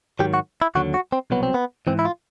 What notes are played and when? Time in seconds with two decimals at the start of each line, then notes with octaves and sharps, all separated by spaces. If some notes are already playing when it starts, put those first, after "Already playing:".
0.19 G#2 D#3 F#3 G4
0.34 F#4
0.62 E4
0.75 D#2 D3 F#3 F#4
0.94 F#4
1.12 C4
1.30 C2 B2 F#3 B3
1.43 C4
1.54 B3
1.87 G#2 E3 C4
1.99 E4
2.05 F4